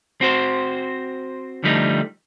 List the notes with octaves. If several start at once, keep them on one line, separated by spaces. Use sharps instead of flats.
C4 F#4 C5
D3 F3 G3 A3 D#4